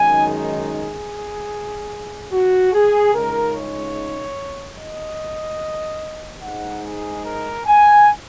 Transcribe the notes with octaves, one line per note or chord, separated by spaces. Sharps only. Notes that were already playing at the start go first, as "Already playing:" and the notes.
Already playing: F#2 D#3 G#3 D#4 G#5
G#4
F#4
G#4
C#2 C#3 G#3 D#4 A#4
C#5
D#5
G#2 G#3 D#4 F#5
G#4
A#4
G#5